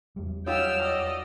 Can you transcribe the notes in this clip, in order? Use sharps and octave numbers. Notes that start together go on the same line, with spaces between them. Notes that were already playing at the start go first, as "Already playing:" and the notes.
E2 G3
F#3 D#4 F4 G4 G5 E6 F6
D5 D#5